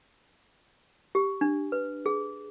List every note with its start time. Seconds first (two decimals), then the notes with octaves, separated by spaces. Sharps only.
1.15 G4
1.41 D4
1.72 B4
2.06 G#4